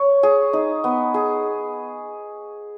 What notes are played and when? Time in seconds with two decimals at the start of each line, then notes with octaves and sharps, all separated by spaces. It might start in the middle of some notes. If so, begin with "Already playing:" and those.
Already playing: C#5
0.23 G#4
0.53 D#4
0.84 B3
1.14 G#4